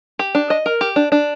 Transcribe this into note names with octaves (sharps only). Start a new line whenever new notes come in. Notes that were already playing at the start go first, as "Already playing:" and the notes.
G4
D4
D#5
A#4
G4
D4
D4